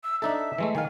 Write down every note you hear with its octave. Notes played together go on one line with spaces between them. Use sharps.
E6
D4 D#4 A4 E5
E3 G#3 A3
D#3 F5 G#5